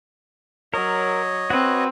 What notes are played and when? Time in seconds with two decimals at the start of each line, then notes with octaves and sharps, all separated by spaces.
0.74 F#3 A#4 C#5 D#5
1.50 C4 F#4 B4